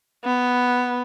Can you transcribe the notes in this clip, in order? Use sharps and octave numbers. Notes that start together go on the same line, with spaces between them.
B3